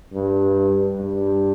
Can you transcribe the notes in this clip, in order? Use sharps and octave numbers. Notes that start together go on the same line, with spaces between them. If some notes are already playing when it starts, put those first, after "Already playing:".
G2
G2